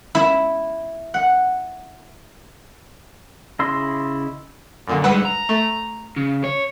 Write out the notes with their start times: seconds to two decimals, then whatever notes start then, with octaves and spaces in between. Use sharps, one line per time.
0.15 E4
1.14 F#5
3.59 C#3 E4 D#5 C6 E6
4.87 F#2 A#2 D3
5.04 G2 G#3 B4 F#5 E6
5.25 A#5
5.49 A3
6.16 C#3
6.44 C#5